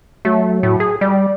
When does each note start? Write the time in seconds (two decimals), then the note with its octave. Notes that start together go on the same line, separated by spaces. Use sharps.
0.25 F#3 A3
0.63 A2
0.80 G#4
1.01 G3 D5